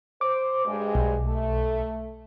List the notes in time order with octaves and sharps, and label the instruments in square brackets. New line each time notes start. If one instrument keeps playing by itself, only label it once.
[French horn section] C5 [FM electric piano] D6
[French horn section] G2 G#3
[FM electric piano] B1
[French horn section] A3